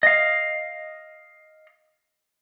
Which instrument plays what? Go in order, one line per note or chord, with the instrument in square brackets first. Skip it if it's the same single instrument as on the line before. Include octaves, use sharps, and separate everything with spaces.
[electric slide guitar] D#5 F5